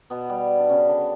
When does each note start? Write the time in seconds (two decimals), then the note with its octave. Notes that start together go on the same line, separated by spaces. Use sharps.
0.10 B2 B3
0.29 G3
0.59 D4
0.69 C#3 C#4
0.89 D3 D4